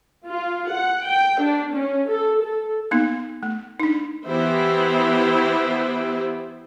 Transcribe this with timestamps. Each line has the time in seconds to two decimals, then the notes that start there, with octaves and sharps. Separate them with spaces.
0.26 F4
0.71 F#5
1.05 G5
1.41 D4
1.74 C#4
2.09 A4
2.41 A4
2.91 A#3 B3 D#4
3.43 A3
3.80 D4 D#4
4.27 E3 B3 E4 G4 C5